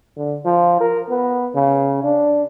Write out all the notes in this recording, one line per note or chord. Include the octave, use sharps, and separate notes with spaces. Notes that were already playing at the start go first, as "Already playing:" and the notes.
D3
F3
A#4
B3
C#3
D4